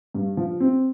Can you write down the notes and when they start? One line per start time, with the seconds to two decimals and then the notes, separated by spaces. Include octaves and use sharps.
0.14 G2
0.37 F3
0.60 C4